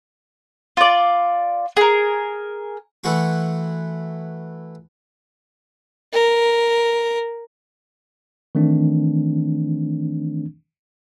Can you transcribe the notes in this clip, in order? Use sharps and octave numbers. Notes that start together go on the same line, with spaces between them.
F4 D5
G#4 A#4
E3 A3 F#4 C6 C#6
A#4
D#3 E3 A3 C4 D4